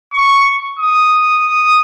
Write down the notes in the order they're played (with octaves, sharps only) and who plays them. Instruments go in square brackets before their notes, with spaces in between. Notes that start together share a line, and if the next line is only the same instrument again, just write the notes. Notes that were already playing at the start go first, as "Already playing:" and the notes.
[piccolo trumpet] C#6
D#6